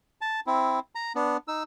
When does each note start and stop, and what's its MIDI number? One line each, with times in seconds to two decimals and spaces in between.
0.21 0.40 81
0.47 0.79 60
0.47 0.79 64
0.95 1.13 82
1.15 1.37 59
1.15 1.37 62
1.48 1.63 63
1.48 1.63 88